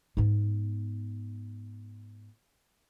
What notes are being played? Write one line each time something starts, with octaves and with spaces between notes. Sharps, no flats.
G#2 B3